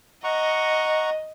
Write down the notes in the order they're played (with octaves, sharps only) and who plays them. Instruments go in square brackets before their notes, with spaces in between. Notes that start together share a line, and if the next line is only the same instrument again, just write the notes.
[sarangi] D#5 [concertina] F#5 A#5 C#6